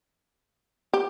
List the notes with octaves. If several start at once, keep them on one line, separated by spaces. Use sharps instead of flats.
G4